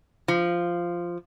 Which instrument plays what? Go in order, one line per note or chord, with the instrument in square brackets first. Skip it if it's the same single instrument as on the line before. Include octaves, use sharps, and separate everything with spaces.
[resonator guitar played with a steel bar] F3